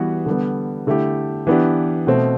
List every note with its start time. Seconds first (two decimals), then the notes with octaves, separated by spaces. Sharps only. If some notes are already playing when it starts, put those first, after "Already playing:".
Already playing: E3 G3 B3 F#4
0.26 D3 G3 B3
0.87 D3 A3 E4 G4
1.47 E3 B3 D4 G4
2.07 B2 A3 C4